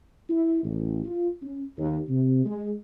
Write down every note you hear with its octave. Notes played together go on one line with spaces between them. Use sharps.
E4
A1
F4
C#4
D#2
C3
G#3